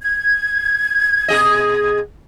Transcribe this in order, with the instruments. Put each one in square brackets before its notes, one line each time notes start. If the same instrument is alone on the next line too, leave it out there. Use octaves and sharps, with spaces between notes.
[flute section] G#6
[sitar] B2 G#4 D#5